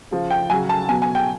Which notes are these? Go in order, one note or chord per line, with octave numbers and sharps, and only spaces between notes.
C#3 F3
G5
C#3 F#3 G#5
A5
B2 F#3 G#5
G#5
G5